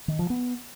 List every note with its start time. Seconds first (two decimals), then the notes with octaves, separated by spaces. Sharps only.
0.08 D#3
0.19 F3
0.30 B3